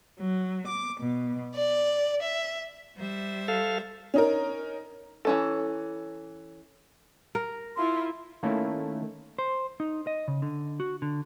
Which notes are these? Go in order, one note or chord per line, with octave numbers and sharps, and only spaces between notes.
F#3
D6
B2
D5
E5
G3 C5 E5
A4 F5
C#4 D#4 A#4
E3 C#4 A4
A#4
E4 F4 C6
D#3 A3 A#3 C#4 E4
C5
D#4
D#5
C#3
D3
F#4
D3